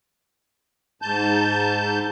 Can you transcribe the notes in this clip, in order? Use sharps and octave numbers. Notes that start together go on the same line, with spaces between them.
G#2 A5 G6